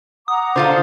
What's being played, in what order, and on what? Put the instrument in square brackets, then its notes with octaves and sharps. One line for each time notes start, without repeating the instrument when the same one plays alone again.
[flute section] F#5 A#5 D6 [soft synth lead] D#6
[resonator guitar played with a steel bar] D3 F4 F5 [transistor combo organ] C5